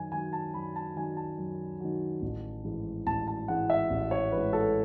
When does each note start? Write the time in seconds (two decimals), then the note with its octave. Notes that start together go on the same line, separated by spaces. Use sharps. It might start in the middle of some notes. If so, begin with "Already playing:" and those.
Already playing: F#2 D#3 F#3 G#5
0.12 D#3 F#3 G#5
0.33 A5
0.54 F#2 B5
0.76 A5
0.96 D#3 F#3 G#5
1.17 A5
1.38 F#2
1.80 D#3 F#3
2.22 A1
2.64 G#2 E3 G#3
3.07 A1 A5
3.27 A5
3.48 G#2 E3 G#3 F#5
3.70 E5
3.90 A1
4.11 C#5
4.32 G#2 E3 G#3 B4
4.53 A4